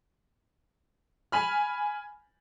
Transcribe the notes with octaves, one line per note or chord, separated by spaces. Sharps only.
G#5 B5 F6